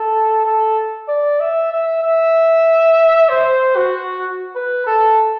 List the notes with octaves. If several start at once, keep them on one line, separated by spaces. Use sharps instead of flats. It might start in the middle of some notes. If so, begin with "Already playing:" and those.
Already playing: A4
A4
D5
E5
E5
E5
C5
F#4
B4
A4